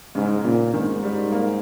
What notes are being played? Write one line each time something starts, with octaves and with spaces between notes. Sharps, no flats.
G#2 C#3
A#2 C#3
G#2 D#3
G3
A#3